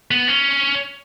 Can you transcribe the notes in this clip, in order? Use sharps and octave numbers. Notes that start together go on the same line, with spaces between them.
B3
C#4